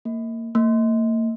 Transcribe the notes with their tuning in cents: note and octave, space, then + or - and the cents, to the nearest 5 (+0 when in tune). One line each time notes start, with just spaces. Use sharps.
A#3 -25
A#3 -40